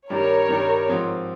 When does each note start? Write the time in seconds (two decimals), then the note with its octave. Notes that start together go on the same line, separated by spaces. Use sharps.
0.10 G2 D#3 G3 A#4 C#5
0.49 G2 D#3 G3
0.88 G#2 F3 C4